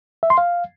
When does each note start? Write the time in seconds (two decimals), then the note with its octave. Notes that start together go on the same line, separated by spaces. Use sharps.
0.23 E5
0.30 C6
0.38 F5